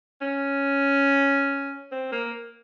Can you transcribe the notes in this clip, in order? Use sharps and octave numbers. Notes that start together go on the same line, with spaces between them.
C#4
C4
A#3